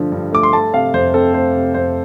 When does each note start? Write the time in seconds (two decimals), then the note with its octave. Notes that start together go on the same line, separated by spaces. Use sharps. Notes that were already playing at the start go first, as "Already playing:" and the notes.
Already playing: G2 D3 F3 A3
0.12 G2
0.33 A3 D6
0.43 C6
0.53 A3 A5
0.73 C3 F5
0.94 F2 C5
1.14 C4 A4
1.33 A3 C5
1.55 C3
1.74 F2 C5